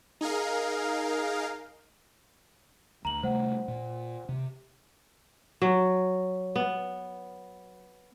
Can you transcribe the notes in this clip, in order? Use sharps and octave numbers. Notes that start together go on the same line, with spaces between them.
D#4 G#4 A#4 F5
D2 A#5 F#7
C3 G3 A3 C5 F#5
A#2
C3
F#3
B3